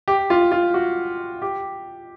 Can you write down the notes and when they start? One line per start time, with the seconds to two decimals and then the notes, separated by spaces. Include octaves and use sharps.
0.08 G4
0.30 F4
0.52 F4
0.74 F#4
1.42 G4